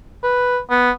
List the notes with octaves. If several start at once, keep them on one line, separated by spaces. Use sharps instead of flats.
B4
B3